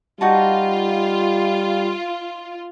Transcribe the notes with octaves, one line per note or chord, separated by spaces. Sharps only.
G3 D#4 F4 F#4 A5